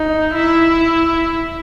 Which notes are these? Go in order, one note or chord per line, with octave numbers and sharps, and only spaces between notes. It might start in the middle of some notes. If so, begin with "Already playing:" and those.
Already playing: D#4
E4